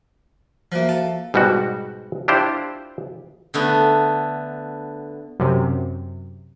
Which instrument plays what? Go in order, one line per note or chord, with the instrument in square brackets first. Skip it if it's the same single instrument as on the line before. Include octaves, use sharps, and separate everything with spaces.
[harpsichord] F3 A#3 [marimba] F4 F#4 E5
[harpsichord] A4 [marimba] F5
[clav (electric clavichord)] G#2 B2 G3 B3 F#4
D4 E4 F4 G4 C5 D5
[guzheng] D3 A3 B3
[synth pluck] F#2 C3